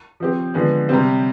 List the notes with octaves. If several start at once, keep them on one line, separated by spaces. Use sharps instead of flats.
F3 C4 G4
D3 F3 G#3 B3
C3 G3 C4